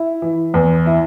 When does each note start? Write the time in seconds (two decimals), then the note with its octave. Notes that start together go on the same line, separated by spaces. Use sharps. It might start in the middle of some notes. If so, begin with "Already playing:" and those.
Already playing: E4
0.22 E3
0.54 E2
0.86 E4